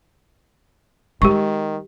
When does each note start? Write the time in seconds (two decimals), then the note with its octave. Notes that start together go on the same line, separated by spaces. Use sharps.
1.22 D#3 G#3 G4 C#6